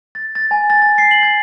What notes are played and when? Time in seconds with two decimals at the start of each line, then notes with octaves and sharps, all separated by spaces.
0.15 A6
0.35 A6
0.51 G#5
0.70 A6
0.82 A6
0.98 C7
1.11 F#7
1.23 G#6